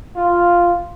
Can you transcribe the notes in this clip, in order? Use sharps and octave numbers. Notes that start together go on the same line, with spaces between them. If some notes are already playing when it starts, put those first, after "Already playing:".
F4